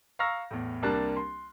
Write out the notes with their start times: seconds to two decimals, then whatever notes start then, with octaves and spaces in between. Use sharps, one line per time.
0.19 F5 A#5 C#6 E6 F6 A#6
0.51 E2 A2
0.82 C2 G3 A#3 D4 A5 F#6
1.17 C6